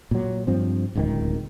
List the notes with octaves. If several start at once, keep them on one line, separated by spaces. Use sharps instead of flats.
A#2 F#3
G2 F3 C4
D1 C#2 D3 D#3